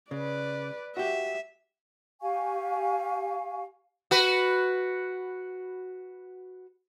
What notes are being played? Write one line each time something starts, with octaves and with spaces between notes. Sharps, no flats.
C#3 B4 D5
F#4 G4 E5
G4 F5 G#5 C#6
F#4 B4